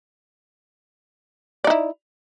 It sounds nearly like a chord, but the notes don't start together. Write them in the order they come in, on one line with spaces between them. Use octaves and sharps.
D5 D#4 E4